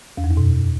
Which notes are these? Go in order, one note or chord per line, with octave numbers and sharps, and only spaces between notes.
E2
F2
F#2
B2